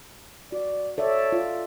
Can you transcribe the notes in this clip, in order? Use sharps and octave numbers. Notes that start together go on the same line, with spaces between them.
F#4 D5
A4 C#5 D5 E5
F4